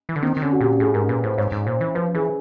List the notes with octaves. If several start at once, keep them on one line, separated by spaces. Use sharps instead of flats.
E3
D3
D#3 C4
D#3
D3 C#4
F#4
A#2 G4
A2 G#4
G#2 A#4
A#2 B4
A2 C5
G#2 C#5
G#2
A#2 C5
E3
F3 B4
E3 G#4